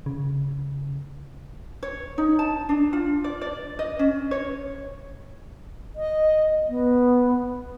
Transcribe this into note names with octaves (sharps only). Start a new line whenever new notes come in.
C#3
C#5
D#4
A5
D4
F4
D5
D5
D#5
C#4
C#5
D#5
B3